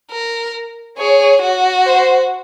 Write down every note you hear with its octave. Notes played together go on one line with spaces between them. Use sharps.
A#4
G#4 C#5
F#4
C5